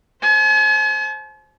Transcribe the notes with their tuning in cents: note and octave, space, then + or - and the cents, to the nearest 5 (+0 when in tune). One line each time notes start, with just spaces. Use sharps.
C5 +15 G#5 +45